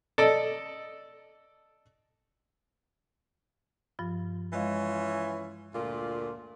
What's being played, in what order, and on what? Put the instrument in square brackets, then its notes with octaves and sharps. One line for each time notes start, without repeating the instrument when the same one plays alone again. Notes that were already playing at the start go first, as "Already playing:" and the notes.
[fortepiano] A4 D5 D#5
[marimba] G2 F3 F4
[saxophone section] E3 C#4 F4 [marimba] G#3 D#5 F5
[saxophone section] D2 A#2 F4